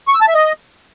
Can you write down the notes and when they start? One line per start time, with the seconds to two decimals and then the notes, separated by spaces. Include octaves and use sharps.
0.08 C#6
0.15 E6
0.21 A5
0.28 E5
0.35 D#5